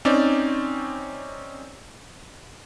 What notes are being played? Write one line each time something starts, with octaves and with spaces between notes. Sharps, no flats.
C4 C#4 D#4 D5